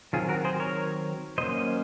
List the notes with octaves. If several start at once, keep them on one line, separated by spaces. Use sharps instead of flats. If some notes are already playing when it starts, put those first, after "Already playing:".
D#3 F#3 C4 F4 G#4
F#4 A#4
G#4 C5
A#4 C#5
F#3 A#3 C#4 C5 D#5